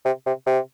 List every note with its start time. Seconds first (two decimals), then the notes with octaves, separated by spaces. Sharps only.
0.05 C3
0.26 C3
0.46 C3